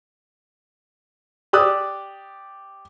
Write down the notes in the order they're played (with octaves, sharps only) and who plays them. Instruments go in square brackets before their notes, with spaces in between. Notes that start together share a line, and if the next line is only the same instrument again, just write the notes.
[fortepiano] G4 D5 D#6 E6 F#6